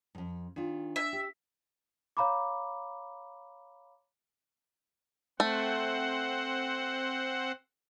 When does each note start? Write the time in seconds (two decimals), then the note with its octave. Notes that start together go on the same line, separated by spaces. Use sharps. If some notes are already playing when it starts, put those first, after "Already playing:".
0.15 F2 G#2
0.56 D#3 D4 F4
0.96 E5
1.13 G4
2.17 C#5 F5 A#5 B5 D6
5.40 A3 C4 C5 F#5